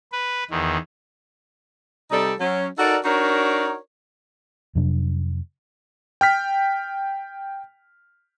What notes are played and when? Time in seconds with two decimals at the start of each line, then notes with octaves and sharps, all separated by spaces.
0.12 B4
0.50 E2 D#3
2.11 C3 G3 D#4 A4 D5
2.39 F#3 C#4
2.79 D#4 F#4 A4 A#4 D5
3.05 D4 D#4 F#4 A#4 C#5 D5
4.75 F2 C3 F#3 D4
6.21 G5 F6 B6